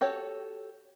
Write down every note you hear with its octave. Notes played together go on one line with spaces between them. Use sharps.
F#4 G4 A4 C#5